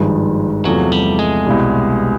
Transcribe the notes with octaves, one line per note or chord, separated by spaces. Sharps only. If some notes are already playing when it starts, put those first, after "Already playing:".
Already playing: G#1 G2 D#3 F3 G#3
E2 C3 F3 F#3 A3
G3
G#3
C2 B2 G3